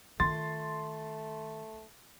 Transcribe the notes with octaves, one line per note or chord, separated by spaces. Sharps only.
D#3 A3 F4 C6 A6